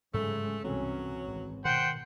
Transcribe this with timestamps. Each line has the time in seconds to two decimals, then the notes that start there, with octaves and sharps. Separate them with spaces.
0.14 G1 G#2 C#3 F#3 G#3 A3
0.64 C2 B2 E3 F#3 C4 C#4
1.25 G#1
1.65 B2 D#3 C5 F#5 G5